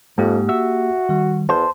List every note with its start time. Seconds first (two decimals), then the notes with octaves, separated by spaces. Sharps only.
0.18 F2 G#2 A#3 G4
0.49 F#4 E5
1.09 D#3 G3
1.49 E2 C5 A5